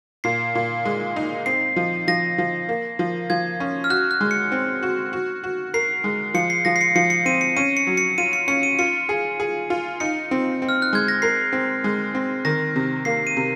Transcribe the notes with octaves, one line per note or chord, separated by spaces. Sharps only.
A#2 C7
A#2
G#3
D#4
C4 C7
F3
F3 A#6
F3
A#3
F3
F3 G#6
C#4
F6
F#4 F#6
F#6
G#3
C#7
C4
F#4
F#4
F#4
A#4 C7
G#3
F3 C#7
C7
F3 A#6
C7
C#7
F3 C#7
C#7
C4 D#7
C#7
C#4 D#7
C#7
F#3
C#7
F4 D#7
C#7
C#4 C#7
D#7
F4 C#7
G#4
G#4
F4
D#4 C#7
C4
C4
F6
F#6
G#3 G#6
A#6
A#4 C7
C4
G#3
C4
D#3 A#6
C3
A#3 C7
D#7
C3